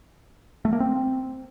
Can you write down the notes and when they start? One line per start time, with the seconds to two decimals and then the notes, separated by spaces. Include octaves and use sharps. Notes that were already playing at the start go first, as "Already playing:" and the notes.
0.65 A3
0.73 A#3
0.80 C4